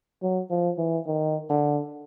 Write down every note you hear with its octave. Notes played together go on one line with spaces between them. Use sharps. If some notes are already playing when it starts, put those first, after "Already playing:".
F#3
F3
E3
D#3
D3